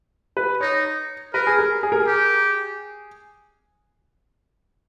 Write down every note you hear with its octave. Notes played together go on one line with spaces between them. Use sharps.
B4
D#4 C#5
A#4 B4
G#4
A#4
G#4
A#4
G#4
G4